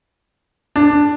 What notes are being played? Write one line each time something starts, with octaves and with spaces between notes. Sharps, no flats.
D4